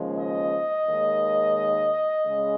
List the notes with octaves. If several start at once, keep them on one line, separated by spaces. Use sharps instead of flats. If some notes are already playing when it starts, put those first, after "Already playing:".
Already playing: D#2 C#3 F3 G#3
D#5
D#2 D#3 G#3
C#3 G#3